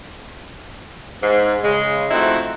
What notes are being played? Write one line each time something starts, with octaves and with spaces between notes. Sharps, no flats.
G#2
C#3 G#3
F3 A3 C4 D#4 E4 F#4